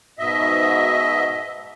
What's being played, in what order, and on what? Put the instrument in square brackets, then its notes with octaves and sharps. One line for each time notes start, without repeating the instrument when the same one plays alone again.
[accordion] G#2 B2 D#5 E5